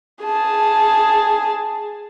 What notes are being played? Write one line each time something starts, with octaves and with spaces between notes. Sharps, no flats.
G#4 A5